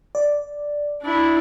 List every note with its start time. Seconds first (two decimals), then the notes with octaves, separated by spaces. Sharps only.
0.15 D5
1.02 D4 E4